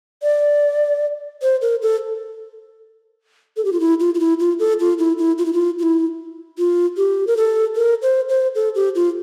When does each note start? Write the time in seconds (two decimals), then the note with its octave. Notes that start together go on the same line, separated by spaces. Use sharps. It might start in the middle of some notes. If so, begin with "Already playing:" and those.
0.23 D5
1.42 C5
1.62 A#4
1.82 A4
3.57 A4
3.65 G4
3.73 F4
3.80 E4
4.00 F4
4.15 F4
4.20 E4
4.39 F4
4.59 A4
4.80 F4
4.99 E4
5.18 E4
5.38 F4
5.46 E4
5.53 F4
5.79 F4
5.83 E4
6.58 F4
6.97 G4
7.27 A#4
7.37 A4
7.76 A#4
8.02 C5
8.29 C5
8.55 A4
8.75 G4
8.95 F4